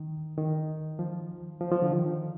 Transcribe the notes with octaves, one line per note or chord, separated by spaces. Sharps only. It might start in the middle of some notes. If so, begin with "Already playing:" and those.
Already playing: D#3
D#3
F3
F3
F3
D3
D#3